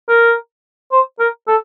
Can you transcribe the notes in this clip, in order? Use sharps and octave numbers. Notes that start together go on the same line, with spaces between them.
A#4
C5
A#4
A4